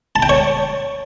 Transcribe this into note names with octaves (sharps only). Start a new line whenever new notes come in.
A5
G5
C#5